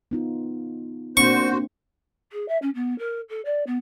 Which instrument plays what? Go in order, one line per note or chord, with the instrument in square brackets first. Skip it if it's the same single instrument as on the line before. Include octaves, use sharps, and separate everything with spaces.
[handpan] B3 D#4 F4
[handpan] A#3 C4 D4 [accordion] F#4 C5 [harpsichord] C#6
[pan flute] G#4
E5
C#4
B3
A#4
A4
D5
B3